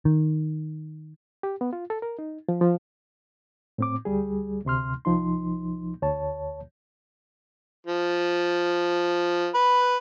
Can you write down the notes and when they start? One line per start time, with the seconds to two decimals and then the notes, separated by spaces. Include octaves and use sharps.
0.05 D#3
1.43 G4
1.61 B3
1.73 F4
1.90 A4
2.02 A#4
2.19 D#4
2.49 F3
2.61 F3
3.78 A2 C4 D6
4.05 D2 G3 G#4
4.65 D2 C3 C6 F6
5.05 C2 F3 D#4 C6
6.02 D2 C#5 A5
7.87 F3
9.54 B4